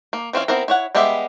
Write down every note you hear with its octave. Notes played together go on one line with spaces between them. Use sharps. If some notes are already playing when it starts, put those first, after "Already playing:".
A#3
E3 C4 C#4 F5
B3 C4 E4 A#4
E4 C#5 F#5
G3 G#3 B3 G4 E5